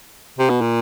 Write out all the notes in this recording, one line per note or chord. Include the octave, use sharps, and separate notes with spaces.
C3
B2
A#2